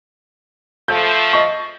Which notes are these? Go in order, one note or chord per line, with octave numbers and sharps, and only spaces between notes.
F3 A3 G6
D#5 C#6